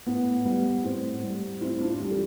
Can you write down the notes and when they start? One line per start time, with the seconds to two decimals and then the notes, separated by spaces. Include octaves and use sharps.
0.06 A2 B3
0.45 G3 B3
0.84 A2 C4
1.23 G3
1.61 A2 C4 E4
1.80 D4 F4
2.00 E3 G3 E4 G4
2.11 A4